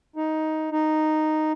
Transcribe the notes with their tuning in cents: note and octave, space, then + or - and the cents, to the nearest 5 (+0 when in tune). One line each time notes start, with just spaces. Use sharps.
D#4 +10
D#4 -5